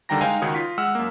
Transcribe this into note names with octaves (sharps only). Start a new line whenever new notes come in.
D3 D#3 G3 G5 A#5 A#6
G#3 D#4 C5 F5 G5 G#5
C#2 D#3 F#4 C#5 D#6
F4 B6
G#3 F#5 E6 F6
F#2 A#3